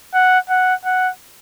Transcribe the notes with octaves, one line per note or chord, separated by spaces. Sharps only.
F#5
F#5
F#5